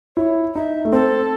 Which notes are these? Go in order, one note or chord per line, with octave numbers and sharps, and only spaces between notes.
E4 C#5
D#4 E5
A3
C4 A4